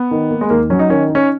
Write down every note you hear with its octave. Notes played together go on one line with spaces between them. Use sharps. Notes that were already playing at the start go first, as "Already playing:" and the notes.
Already playing: B3
D#3
A#3
G#3
D#2 A#3
F#3 C#4
D#4
D#3 C#4
D#4
C#4